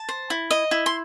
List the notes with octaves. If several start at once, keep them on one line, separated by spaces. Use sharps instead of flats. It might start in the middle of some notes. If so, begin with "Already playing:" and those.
Already playing: A5
C5
E4
D#5
E4
C6